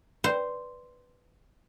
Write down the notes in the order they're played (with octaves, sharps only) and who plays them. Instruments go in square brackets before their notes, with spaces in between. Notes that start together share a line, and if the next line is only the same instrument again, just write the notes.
[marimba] B4 D5 G5 [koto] C5